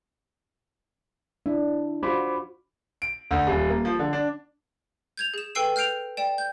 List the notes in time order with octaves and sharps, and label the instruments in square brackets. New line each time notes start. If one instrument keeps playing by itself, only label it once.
[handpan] D4 [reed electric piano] E4
[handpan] F4 F#4 [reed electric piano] C5 B5 D6
[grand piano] D7
D2
D#1
A#3
F3
D3
D4
[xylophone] G6 G#6 F7
G#4 E7
A4 B4 G5 E6 C7 D#7
F6 G6 C7 D7 F7
D5 G5 E7
G6